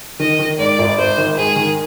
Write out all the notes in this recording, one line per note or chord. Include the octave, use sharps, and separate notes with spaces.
D#3 D#5
D#3
G#2 D5
G#1
G#1 C5
D#3
G#2 G#4
D#3